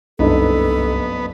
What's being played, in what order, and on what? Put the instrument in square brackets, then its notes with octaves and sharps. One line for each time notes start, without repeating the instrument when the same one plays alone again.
[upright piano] F#1 G2 D#4 [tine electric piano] C2 [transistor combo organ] B3 [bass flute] A4